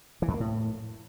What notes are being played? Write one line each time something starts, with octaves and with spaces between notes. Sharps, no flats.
E3
F2
A#3
A2